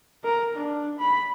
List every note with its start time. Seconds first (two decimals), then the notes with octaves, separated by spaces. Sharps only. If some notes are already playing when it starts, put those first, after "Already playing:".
0.25 A#4
0.55 D4
0.99 B5